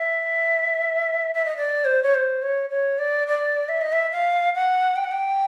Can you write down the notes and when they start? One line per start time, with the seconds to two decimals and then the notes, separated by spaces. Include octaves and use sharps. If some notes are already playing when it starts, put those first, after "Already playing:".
Already playing: E5
1.34 E5
1.45 D#5
1.57 D5
1.85 C5
2.03 C#5
2.14 C5
2.42 C#5
2.70 C#5
2.99 D5
3.27 D5
3.69 E5
3.81 D#5
3.92 E5
4.12 F5
4.55 F#5
4.96 G5
5.04 F#5
5.11 G5